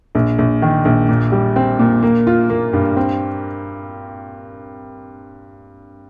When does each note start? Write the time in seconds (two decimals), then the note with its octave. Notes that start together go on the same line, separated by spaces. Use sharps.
0.15 A#1
0.38 A#1
0.62 D#3
0.85 A#1
1.09 A#2
1.32 G3
1.56 C4
1.79 A#2
2.03 A#3
2.27 F4
2.50 A#3
2.73 G2
2.97 C4